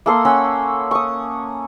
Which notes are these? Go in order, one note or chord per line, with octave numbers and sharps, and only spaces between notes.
A#3 A4 C6 D#6
C#4 F#5 C6 E6
C#6 D#6